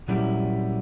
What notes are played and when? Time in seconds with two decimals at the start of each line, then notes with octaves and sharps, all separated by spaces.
0.08 A#2 F#3 G3 C#4 E4